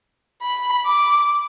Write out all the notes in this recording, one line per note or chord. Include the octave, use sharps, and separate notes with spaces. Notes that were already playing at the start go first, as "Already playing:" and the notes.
B5
D6